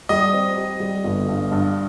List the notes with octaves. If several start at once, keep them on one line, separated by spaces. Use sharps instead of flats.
G3 D#5
C4
G4
G3
G1
G2
G2